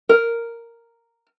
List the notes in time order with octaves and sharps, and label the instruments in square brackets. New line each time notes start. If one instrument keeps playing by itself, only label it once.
[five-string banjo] A#4